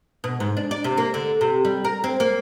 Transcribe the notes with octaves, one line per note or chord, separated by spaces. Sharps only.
B2
G#2
D4
D5
C3
A#3
D3
C3
G3
A#4
C4
A#3